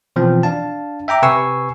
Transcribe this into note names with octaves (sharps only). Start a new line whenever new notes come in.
B2 E3 F3 C4
D4 F5 A5
E5 G5 A#5 D6
C3 B4 G#5 C#6 E6 C7